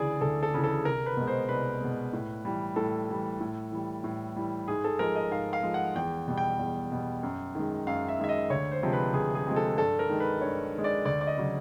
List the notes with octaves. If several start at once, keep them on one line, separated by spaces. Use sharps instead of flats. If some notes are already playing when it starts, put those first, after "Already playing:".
Already playing: D2 C#3 E3 G#4 D5
D2 A4
A4
C#3 E3
A4
C2 A#4
B4
B2 G#3
C5
C2 B4
B2 G#3
A2
E3 G3
A2 A4
E3 G3
A2
E3 G3
A2
E3 G3
G#2 G#4
A4
F3 G#3 A#4
D#5
G#2 F5
F5
F3 G#3
F#5
E2 G5
B2 G3
G5
E2
B2 G3
F#2
D#3 G#3
F#2 F5
E5
D#3 G#3 E5
D#5
D2 C#5
C5
C3 F3 G#3
B4
D2 G#4
G#4
C3 F3 G#3
A4
G2 A4
A#4
D#3 G#3
B4
G2 C#5
D#3 G#3
D5
D2 D5
D5
D#5
C#3 F#3